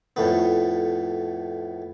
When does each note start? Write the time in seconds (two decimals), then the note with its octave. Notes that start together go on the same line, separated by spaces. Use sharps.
0.16 F2 A2 B3